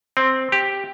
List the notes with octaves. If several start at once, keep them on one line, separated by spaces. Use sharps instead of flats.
C4
G4